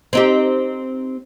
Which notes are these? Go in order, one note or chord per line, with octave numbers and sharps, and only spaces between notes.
C4 D#4 G4